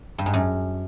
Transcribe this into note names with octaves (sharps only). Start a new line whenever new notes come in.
G2
G#2
F#2